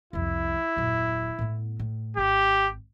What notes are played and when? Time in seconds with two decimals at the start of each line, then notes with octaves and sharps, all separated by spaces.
0.13 C2 F2 E4
0.76 D#1 F#2
1.39 A2 B3
1.79 A2
2.17 G#1 G4